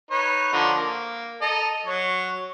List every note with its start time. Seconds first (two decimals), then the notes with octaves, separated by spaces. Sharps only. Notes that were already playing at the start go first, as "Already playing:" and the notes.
0.11 D#4 B4 C#5
0.53 D3 F3 A#5
0.77 A#3
1.42 A4 D#5 A#5
1.86 F#3 C#5